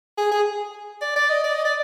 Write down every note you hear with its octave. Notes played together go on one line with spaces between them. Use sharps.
G#4
G#4
D5
D5
D#5
D5
D#5
D5